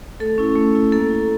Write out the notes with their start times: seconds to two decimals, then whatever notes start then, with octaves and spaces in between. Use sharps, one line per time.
0.20 A3 A4
0.38 C#4 E4
0.56 A3
0.75 C#4 E4
0.92 A#3 A4
1.10 E4